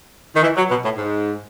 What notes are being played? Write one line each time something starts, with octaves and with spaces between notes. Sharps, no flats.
D#3
E3
F#3
B2
A2
G#2